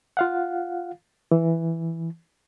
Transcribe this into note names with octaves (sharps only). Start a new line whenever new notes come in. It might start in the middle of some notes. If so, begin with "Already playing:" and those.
F4 F5 F#5
E3